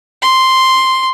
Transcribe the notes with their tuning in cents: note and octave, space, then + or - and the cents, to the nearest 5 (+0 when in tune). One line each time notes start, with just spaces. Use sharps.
C6 +0